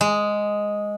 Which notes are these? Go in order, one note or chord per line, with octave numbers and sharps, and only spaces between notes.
G#3